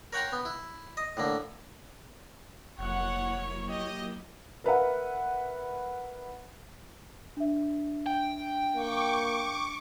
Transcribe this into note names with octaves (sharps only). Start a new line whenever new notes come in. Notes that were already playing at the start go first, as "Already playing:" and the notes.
A#4 C#5 F#5 G5 A#5 C6
B3
E4
D#5
A2 D3 A#3
F1 F#3 A#3 E4 C#5 F#5
G4 D#5
A#4 B4 E5 F#5
D4 E5
G5
A#3 C#6 D6